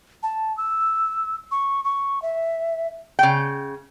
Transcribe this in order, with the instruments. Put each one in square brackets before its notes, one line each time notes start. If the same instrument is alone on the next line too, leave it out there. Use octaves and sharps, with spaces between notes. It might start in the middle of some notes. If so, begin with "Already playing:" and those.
[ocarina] A5
E6
C#6
C#6
E5
[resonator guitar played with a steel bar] C#3 G5